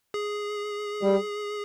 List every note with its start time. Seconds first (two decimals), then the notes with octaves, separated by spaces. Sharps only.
0.14 G#4
1.02 G3